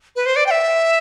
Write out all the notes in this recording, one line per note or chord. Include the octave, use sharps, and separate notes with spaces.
B4
C5
D5
G5
E5